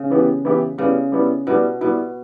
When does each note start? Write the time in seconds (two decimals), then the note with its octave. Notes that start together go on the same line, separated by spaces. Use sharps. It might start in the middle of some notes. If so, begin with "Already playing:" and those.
Already playing: C#3
0.10 E3 B3 E4 G4
0.45 E3 B3 E4 G4
0.78 C#3 G3 B3 E4
1.12 G3 B3 E4
1.47 B2 G3 B3 E4
1.81 B2 G3 B3 E4